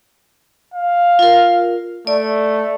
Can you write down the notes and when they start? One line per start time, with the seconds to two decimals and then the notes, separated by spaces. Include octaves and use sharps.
0.74 F5
1.19 F4 A#4
2.07 A3 D5